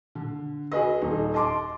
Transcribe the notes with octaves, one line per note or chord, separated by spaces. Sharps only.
D3
F#4 G#4 B4 D#5
D#1 D#4
D#5 A5 C6 D6